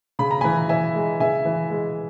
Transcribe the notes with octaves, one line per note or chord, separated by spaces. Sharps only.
C#3 B5
A#5
E3 G#5 B5
E3 E5 G#5
G#3
C#3 E5 G#5
E3
G#3